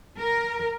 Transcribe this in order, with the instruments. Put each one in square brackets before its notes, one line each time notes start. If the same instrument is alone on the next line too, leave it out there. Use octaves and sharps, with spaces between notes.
[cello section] A#4